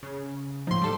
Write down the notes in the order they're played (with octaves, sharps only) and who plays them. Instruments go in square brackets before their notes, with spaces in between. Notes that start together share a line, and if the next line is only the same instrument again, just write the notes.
[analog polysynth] C#3
[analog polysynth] A2 F3 [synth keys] D#4 C6
[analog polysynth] G3 A4